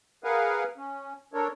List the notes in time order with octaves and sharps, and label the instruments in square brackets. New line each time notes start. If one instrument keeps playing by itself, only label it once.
[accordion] G#4 A#4 B4 F5 F#5 G#5
C#4
D4 A4 A#4 C#5